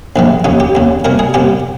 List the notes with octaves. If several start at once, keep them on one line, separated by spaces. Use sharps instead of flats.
A#1 G#2 D#3
D#2 C#3 D#4
G4
D#2 C#3
C2 A#2 A#4
G#4
C2 A#2 G4